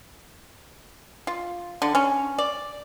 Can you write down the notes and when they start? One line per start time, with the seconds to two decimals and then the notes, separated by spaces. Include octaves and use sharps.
1.27 F4
1.82 D3
1.95 C#4
2.38 D5